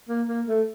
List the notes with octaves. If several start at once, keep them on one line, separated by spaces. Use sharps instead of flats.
A#3
A#3
A3